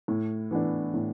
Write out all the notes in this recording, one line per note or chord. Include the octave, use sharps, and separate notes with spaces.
A2
E3 B3 D4
A2